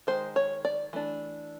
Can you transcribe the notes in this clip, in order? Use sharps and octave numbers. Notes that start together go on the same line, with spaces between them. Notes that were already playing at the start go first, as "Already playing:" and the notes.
D#3 G#3 C5
C#5
D5
E3 A3 D4